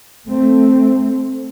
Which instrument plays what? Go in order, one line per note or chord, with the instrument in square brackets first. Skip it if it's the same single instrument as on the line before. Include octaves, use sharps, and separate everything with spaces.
[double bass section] A3 C4